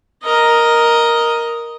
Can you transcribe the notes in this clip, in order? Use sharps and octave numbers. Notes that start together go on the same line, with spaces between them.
A#4 D#5